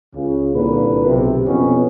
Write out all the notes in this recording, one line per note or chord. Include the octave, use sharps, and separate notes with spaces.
C#2 C#3
C2 A#2 D3 A#3 B4
B1 C3
F2 B2 B3 C#4